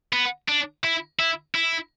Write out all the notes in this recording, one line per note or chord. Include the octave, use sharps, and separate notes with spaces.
B3
D4
E4
E4
E4